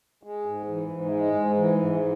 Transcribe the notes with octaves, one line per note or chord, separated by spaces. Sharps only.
G#3
G#2
E3
G#2
G#3
G#2
E3
G#2